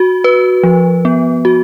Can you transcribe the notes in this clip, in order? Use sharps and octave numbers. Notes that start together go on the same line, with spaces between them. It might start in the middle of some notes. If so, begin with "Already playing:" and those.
Already playing: F#4
B4
F3
B3
F#4